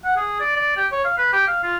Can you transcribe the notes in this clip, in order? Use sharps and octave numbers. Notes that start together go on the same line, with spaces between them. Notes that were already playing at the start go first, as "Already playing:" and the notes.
F#5
G#4
D5
D5
G4
C#5
F5
B4
G4
F5
F4